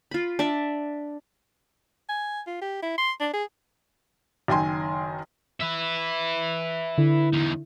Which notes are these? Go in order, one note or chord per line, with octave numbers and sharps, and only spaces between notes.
F4 B5
D4 D5 E5
G#5
F4
G4
E4
C6
D4
G#4
F#1 D#3 G5 G#5 C6
B4 E5
D3 E4
E2 D#4